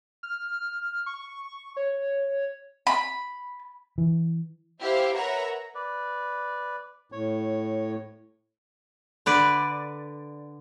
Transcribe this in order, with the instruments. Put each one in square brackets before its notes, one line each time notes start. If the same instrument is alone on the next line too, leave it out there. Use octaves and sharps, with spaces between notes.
[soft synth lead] F6
C#6
C#5
[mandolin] B5
[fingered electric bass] E3
[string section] E4 G4 C5 E5 F5
A#4 B4 C#5 E5 F#5 A#5
[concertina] B4 D5
[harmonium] A2 [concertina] C#5
[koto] D3 B4 D5